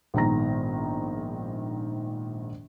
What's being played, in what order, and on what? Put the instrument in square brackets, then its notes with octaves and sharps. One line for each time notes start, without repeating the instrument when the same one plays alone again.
[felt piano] A#1 G#2 D#3 B3 A#5 A#6